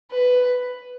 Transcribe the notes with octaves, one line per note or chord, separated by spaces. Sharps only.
B4